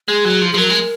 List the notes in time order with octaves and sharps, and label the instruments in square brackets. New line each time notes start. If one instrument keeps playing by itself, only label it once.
[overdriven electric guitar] G#3 [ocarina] G#4
[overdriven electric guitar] F#3
F3
[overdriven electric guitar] F3 [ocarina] G#4
[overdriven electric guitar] F#3 [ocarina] A#4
[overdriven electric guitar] G#3